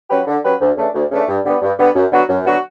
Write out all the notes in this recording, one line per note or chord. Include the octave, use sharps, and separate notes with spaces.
F#3 C#4 G4 B4
D3
F#3 C#4 G4 B4
D2
C#3 E3 A3 D4
D2
C#3 E3 A3 D4
G2
D3 G3 B3
G2
D3 G3 B3
F#2
D3 F#3 B3 F#4
F#2
D3 F#3 B3 F#4